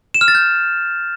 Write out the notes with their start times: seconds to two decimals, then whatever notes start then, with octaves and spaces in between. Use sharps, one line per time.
0.14 E7
0.21 F6
0.28 A6
0.35 G6